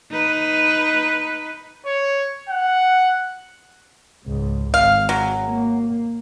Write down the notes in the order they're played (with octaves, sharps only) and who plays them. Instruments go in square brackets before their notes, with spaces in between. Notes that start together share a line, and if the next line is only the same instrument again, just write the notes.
[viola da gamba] D#4 B4
[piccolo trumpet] C#5
F#5
[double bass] C#2 G#2
[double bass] G#1 [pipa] F5
[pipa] F#3
[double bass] A#3